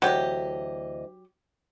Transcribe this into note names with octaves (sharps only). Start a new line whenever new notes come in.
D2 E3 F#3 G4 D#5